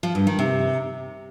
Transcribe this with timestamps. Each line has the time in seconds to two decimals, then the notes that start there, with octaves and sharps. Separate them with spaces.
0.03 F3
0.15 G2
0.27 D#3
0.39 C3